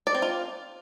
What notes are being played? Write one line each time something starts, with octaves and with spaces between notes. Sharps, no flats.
D5
C4
F4